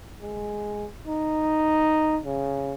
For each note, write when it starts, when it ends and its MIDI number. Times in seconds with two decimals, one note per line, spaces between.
0.22 0.86 56
1.07 2.19 63
2.25 2.74 49